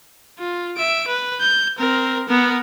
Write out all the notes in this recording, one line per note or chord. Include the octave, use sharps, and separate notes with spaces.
F4
E5 D7
B4
G6
C4 A#4
B3 A#4